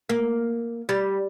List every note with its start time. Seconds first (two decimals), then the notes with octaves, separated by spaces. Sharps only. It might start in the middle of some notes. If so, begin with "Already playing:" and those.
0.09 A#3
0.89 G3